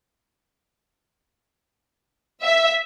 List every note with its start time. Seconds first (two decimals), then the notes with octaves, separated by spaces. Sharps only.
2.42 E5